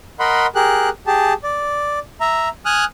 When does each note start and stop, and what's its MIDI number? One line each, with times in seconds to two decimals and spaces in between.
0.20 0.46 70
0.20 0.46 75
0.20 0.46 78
0.20 0.46 83
0.20 0.46 84
0.55 0.89 67
0.55 0.89 68
0.55 0.89 70
0.55 0.89 90
1.07 1.33 67
1.07 1.33 68
1.07 1.33 81
1.43 1.99 74
2.21 2.49 76
2.21 2.49 82
2.65 2.85 80
2.65 2.85 87
2.65 2.85 89
2.65 2.85 90